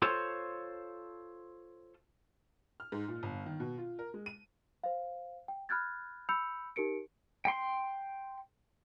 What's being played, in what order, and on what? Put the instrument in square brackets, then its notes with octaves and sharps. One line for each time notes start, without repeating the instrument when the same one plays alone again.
[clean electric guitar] F4 A4 C5 C#5
[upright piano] F6
G#2
A#2
G1
D#3
B2
F4
A#4
G#3
D#7
[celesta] C5 F5
G5
B5 F6 F#6 G#6 A6
B5 E6 G6 C#7 F7
D#4 G4 A#4 C#7 D7
[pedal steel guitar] G5 C6